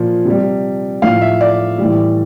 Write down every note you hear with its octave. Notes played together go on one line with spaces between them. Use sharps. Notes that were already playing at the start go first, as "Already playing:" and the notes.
Already playing: A#2 F3
C3 G3
A2 F3 F5
E5
D5
A2 E3 G3